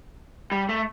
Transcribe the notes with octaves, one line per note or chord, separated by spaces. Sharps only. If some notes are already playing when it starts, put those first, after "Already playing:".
G3
A3